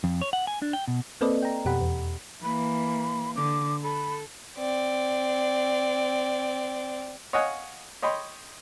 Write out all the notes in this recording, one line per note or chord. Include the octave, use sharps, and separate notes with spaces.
F2
C#5
F#5
G#5
D4
G5
B2
A#3 C4 A4 B4 D5 D#5
G5 A#5
F2 B2 G4 F#5 B5
E2
E3 A#3 B5
D3 D6
A4 B5
C4 D5
C#5 D#5 F5 F#5 G#5 D#6
C#5 D#5 G5 B5 C6